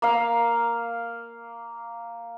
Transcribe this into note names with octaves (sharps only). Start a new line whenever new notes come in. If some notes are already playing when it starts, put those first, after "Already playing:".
A#3 F5